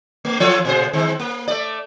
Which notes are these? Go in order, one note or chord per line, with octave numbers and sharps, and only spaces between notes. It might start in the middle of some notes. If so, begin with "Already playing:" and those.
A3
E3 A4 C#5
A#2 C#3 C5
D#3 G#3 C4
A#3
A3 D5